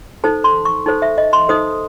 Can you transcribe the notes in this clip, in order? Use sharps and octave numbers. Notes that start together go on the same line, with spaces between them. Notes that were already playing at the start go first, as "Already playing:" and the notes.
D#4 A4 C5 A5
C6
C#6
D#4 A4 C5 A5
E5
D#5
C6
D#4 A4 C5 D#6